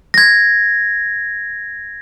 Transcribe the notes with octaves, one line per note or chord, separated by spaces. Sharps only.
G#6 A#6